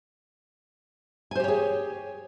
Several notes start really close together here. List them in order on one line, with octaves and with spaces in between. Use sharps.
G#5 C5 G4 C#5 G#4